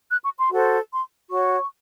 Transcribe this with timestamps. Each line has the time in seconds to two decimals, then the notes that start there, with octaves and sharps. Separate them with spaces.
0.11 F#6
0.24 C#6
0.38 C6
0.50 F#4 A4 C5
0.90 C6
1.30 F#4 C#5 C#6